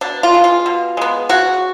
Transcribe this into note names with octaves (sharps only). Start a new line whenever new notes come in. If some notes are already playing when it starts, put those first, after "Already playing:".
B2 D4
F4
G#3 B3
F4
B2
G#3 B3
C#3 F#4